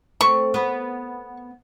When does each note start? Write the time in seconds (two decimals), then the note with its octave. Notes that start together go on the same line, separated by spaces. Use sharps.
0.21 A3 C4 C#6
0.54 B3 B4